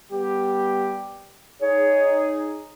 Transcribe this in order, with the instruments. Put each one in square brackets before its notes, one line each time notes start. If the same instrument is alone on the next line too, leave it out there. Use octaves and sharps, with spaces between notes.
[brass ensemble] G3 B3 G4
[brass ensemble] D#4 G#4 [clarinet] C#5